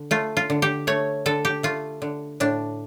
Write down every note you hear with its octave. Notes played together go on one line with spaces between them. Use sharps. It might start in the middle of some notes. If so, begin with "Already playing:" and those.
Already playing: D3
A3 F4
F4
D3
G4
A3 C#5
D3 A4
G4
A3 F4
D3
A2 D4